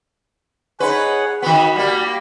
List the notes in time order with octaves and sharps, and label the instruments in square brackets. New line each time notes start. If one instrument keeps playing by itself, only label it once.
[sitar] D#4 B4 [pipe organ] G#4 C#5 F#5
[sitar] D#3 B3 [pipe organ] F#4 B5
[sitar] G3 A#3